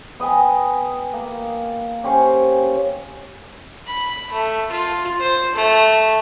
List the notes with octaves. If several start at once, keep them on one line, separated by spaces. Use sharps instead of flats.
B3 D#5 G5 G#5
A#3
C#4 G4 C5 C#5
B5
A3
F4
C5
A3